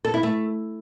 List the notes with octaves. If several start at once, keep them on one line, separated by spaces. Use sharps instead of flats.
A4
E4
A3